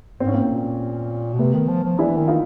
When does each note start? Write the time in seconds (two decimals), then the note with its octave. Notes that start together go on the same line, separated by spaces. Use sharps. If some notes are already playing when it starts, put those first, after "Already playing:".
0.20 G#2 C4
0.27 C#4
0.34 A#3 C4
0.42 A2
0.50 A#2
1.34 B2
1.39 C3 A3 B3
1.54 D#3
1.68 F3
1.84 F3
1.99 E3 D4 E4
2.18 D#3
2.28 D#4 F4